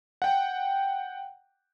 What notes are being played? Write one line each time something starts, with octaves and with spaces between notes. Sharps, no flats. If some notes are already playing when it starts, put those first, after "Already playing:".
F#5 G5